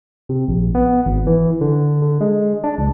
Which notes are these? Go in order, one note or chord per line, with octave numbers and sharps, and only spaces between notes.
C3
A#1
B3
G#1
E3
D3
D3
G#3
D4
C#2